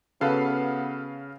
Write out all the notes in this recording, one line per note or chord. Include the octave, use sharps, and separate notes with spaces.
C#3 B3 F#4 A4 B4 F5